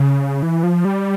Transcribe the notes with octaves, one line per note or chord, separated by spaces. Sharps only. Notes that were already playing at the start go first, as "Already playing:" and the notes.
Already playing: C#3
E3
F3
G3